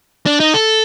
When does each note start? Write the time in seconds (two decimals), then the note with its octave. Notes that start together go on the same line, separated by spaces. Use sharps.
0.26 D4
0.40 D#4
0.54 A4